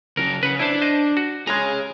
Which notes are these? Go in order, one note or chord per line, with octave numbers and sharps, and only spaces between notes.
C#3 F#3 A#4
C#3 B4 F#5
D4 E4 C5
C5 D#5
F#4
G#3 G#4 C#5 A#5